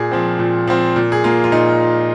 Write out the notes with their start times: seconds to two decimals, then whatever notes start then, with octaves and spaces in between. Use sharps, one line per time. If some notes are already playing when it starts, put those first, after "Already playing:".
Already playing: A#2 G#4
0.11 F3 C4
0.39 A#2
0.67 F3 C4
0.96 A#2
1.12 G#4
1.24 A#3 F4
1.44 F4
1.52 A#2 D#4